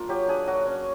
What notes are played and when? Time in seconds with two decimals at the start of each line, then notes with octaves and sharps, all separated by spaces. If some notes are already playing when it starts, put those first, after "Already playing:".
Already playing: A#3 D4 F4
0.09 F#3 G4
0.28 D4 G#4
0.47 F#3 F#4
0.67 C#4